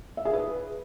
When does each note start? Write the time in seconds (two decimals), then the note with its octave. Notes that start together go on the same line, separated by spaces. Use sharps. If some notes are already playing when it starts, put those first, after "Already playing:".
0.17 E5
0.25 G#4
0.33 B4